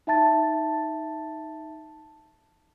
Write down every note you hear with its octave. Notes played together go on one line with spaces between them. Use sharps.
D#4 E5 A5 A6